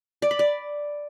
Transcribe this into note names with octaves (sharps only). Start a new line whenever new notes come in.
D5
B5
D5